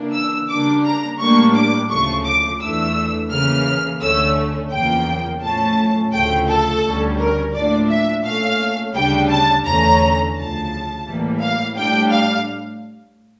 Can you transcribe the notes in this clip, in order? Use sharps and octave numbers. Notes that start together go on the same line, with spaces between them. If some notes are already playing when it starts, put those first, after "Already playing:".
Already playing: C#3 E3 A#3 D4
E6
C#3 G3 A#3 D4 D6
A#5
A2 G3 A#3 D4 C#6
D6
D2 C#3 F3 A3 C#6
D6
E2 E3 A3 D4 E6
C#3 E3 A#3 F6
D2 D3 A3 C#4 E6
E2 C#3 F3 A#3 G5
A2 F3 A3 C#4 A5
D2 C#3 F3 A3 G5
A4
D2 D3 G3 C#4
A#4
A2 F3 A#3 D4 D5
E5
A#2 A3 C#4 F5
D2 C#3 G3 D4 G5
A5
E2 D3 A3 C#4 A#5
D2 C#3 F3 A5
A2 E3 G3 A#3
F5
A2 G3 D4 G5
F5